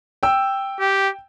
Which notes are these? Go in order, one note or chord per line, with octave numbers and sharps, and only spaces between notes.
G5 E6
G4